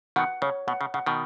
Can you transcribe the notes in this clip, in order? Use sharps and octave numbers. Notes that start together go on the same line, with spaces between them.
B2 D#3 F#5
C#3 C#5
B2 F#5
C#3
C#3 F#5
B2 D#3